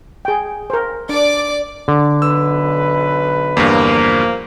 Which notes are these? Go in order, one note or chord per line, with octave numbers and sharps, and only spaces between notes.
G#4 G5
A#4 C5
D4 D5 D6
D3
B1 B4 E6
E2 G2 F3 A#3